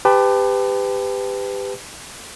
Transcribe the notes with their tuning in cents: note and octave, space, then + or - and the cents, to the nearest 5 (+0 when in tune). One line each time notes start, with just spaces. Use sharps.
G4 +20 B4 +30 A5 +0